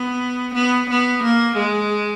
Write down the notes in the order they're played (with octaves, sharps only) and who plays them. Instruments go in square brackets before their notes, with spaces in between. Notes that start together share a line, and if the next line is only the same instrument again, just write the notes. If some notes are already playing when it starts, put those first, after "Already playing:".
Already playing: [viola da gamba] B3
B3
B3
A#3
G#3